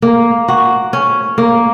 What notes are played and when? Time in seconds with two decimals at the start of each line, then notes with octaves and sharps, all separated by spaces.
0.02 A#3
0.48 F#4
0.93 C#4
1.38 A#3